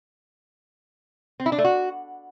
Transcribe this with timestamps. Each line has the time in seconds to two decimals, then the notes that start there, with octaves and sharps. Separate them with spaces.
1.40 C4
1.46 E4
1.52 D4
1.58 A3
1.65 F#4